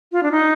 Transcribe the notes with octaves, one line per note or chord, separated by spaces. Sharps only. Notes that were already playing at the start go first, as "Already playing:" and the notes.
F4
D4
D#4